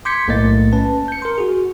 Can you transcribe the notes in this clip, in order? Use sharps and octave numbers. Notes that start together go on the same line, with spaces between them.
C6 D6 G6 G#6 B6 C#7
B1 A2 A3 A#3 D#5 A6
C#4 B4 A5
G6 C#7
A#4 C6
F#4 G#4